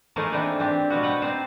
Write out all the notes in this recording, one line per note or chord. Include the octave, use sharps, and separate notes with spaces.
E3 F3 A3 A#3 D#4 G#4
E3 C4 D4 D#4 B4
C4 D4 G4
B2 F3 B3 F#4
B4 F#5 G5
C4 D#4 C5 D5